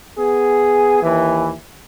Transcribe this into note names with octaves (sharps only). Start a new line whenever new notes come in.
B3 G#4
D#2 E3